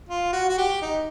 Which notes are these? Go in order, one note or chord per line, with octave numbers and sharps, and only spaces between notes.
F4
F#4
F#4
G4
D#4